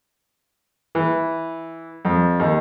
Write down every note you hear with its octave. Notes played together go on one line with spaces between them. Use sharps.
E3
F2
D#2